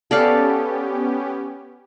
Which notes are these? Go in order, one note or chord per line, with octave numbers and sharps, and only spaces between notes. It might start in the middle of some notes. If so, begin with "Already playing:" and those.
B3 C#4 G4 A4 D5 F5